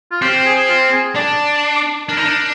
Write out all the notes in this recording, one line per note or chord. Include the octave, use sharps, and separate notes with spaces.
F4
C4 G4
G#4
F4
G#4
D4 D5
D4 A#4
D#4
D4